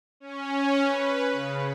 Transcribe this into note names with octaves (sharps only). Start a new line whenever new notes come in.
C#4
B4
C#3